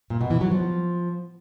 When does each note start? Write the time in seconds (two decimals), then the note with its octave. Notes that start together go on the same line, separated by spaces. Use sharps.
0.10 A#2
0.21 B2
0.30 E3
0.41 F#3
0.51 F3